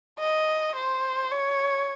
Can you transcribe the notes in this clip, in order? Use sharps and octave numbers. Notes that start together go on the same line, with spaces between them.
D#5
C5
C#5